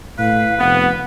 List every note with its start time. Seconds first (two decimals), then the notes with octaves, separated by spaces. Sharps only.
0.18 A2 B4 F5
0.59 F1 B3 F#5